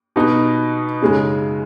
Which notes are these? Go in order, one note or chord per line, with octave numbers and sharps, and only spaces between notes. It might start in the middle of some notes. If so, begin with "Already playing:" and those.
B2 B3 D#4
F#2 C#3 G#3 D#4